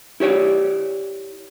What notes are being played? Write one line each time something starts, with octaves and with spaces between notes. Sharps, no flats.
E4 G4 C#5 D5